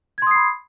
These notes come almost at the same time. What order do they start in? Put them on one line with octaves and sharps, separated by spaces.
G#6 C6 D#6 C7 B5